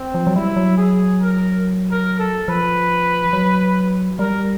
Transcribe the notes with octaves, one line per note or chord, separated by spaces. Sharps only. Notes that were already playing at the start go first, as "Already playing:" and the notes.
Already playing: C4
F3
F#3
G3 E4
F#3
G#4
A#4
A#4
A4
F3 B4
F#3
G3 A#4